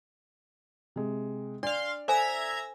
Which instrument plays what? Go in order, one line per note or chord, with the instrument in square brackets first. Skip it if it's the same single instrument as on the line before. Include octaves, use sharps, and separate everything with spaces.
[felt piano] C3 G#3
[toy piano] D4 [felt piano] D5 [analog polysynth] F5 C6
[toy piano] A4 C5 G#5 [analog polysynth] E5 A#5 G#6